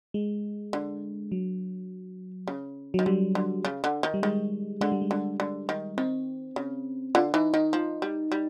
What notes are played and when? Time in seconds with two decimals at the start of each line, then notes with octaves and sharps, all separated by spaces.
0.14 G#3
0.73 D3
1.32 F#3
2.47 C#3
2.94 D#3 F#3
3.06 D3 G3
3.35 D3
3.65 C#3
3.84 D3
4.03 D#3
4.14 G3
4.23 D#3 G#3
4.81 D3 G#3
4.92 G3
5.02 G#3
5.11 D3
5.40 D3
5.69 D#3
5.98 D#3 C4
6.56 C#3
7.15 D3 F4
7.34 E3 D#4
7.53 D#3 D#4
7.73 F3
8.02 G3
8.32 G3